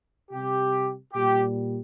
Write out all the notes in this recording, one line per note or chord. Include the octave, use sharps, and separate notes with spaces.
C3 G3 G4
A#2 G3 G4